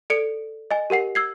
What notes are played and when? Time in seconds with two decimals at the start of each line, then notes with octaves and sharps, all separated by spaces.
0.10 A4 D5 C#7 D7
0.71 D#5 G#5
0.90 G4 A#4 F#5 C7
1.15 E6 G#6 C7